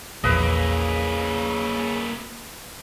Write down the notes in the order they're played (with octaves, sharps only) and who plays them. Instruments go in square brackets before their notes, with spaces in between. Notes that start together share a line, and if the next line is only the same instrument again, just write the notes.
[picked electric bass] A#1 E2 F3 [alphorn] C#3 [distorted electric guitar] A#3 E4 [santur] B4 D#5